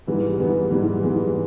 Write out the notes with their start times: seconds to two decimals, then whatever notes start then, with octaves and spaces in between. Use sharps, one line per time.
0.07 G#2 E3 G3 B3
0.39 G#2 E3 G3 B3
0.71 G#2 E3 G3 B3
1.03 G#2 E3 G3 B3